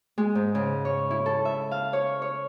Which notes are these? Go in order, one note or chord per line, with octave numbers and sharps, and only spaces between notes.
G#3
G#2
C#3
C#5
E4
A4
E5
F5
C#5
C#5